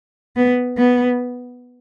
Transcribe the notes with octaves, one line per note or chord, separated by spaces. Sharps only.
B3
B3